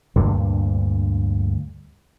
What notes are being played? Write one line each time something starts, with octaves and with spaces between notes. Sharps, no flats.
D2 G2 A#2 D3